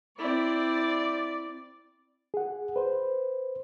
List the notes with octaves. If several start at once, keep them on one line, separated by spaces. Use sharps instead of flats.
C4 E4 D5
G#4 F#5
B4 C5